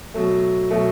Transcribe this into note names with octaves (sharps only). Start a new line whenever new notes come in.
B2 F#3 A3
B2 F#3 A3